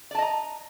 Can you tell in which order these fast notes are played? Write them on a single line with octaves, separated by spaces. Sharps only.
D5 A5 D#5 A#5